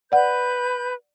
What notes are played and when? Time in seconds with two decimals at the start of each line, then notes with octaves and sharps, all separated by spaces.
0.12 B4 D5 F#5 B5 G6